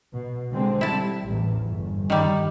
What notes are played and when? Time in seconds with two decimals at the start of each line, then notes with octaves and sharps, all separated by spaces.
0.15 B2
0.51 D3 G#3 C4
0.81 G3 E4 A5
1.29 A1 E2
1.66 G1
2.10 D#3 G3